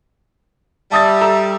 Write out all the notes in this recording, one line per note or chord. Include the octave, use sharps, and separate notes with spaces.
G3 E5 A5 D#6 A6
A4 A#5 E6